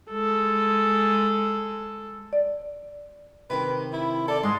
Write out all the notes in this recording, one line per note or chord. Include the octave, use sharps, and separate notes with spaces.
G#3 A4
D5
C3 D#3 A#4 B4
E4
A4 D5
G#2 G#3 C6